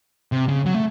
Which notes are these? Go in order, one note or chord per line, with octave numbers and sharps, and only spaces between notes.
C3
C#3
F#3
A3